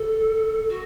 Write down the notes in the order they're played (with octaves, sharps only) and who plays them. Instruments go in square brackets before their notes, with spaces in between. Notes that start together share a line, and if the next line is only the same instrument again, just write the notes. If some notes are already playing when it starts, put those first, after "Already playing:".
Already playing: [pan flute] A4
F#4